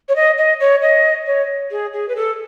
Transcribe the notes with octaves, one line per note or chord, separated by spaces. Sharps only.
C#5
D#5
D#5
C#5
D#5
C#5
G#4
G#4
B4
A4